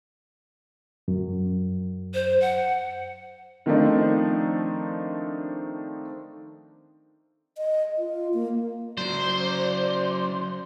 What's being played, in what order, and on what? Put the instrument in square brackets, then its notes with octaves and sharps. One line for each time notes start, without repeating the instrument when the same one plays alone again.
[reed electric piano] F#2
[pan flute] C5
F#5
[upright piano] D#3 F3 A3 C4 D4 D#4
[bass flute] D#5
F4
A#3
[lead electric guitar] C#3 F#3 [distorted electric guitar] C5 [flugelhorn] D5